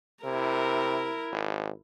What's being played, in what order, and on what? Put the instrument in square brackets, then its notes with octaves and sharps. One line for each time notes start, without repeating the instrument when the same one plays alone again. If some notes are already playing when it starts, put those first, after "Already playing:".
[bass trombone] C3 [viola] E4 A#4
[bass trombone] G#1